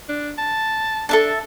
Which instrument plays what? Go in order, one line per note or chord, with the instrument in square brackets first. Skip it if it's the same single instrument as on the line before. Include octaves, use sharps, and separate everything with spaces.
[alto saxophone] D4
A5
[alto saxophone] D4 [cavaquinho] A4 E5 A5